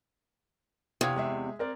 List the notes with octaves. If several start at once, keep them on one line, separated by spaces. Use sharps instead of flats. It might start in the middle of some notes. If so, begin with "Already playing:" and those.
E2 C3 F5 D#6 G#6
G#3 G#4 E5
C4 A#4 D5